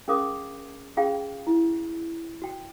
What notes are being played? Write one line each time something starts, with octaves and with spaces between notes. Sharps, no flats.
C#4 G#4 A#4 F5 D6 D#6
C#4 F4 G#4 F5 G5
E4
F#4 G5